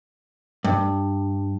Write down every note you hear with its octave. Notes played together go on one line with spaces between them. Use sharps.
G2